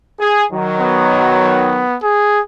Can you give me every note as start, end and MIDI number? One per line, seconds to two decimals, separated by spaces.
0.20 0.44 68
0.52 1.84 51
0.52 1.84 54
0.80 1.97 59
2.03 2.40 68